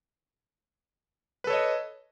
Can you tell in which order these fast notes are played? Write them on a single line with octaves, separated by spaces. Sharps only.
B4 A4 C#5 D#5